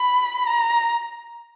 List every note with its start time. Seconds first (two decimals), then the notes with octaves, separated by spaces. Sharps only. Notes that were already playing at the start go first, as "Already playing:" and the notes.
Already playing: B5
0.47 A#5